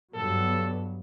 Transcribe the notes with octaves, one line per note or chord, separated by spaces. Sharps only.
G2 F#3 B3 A4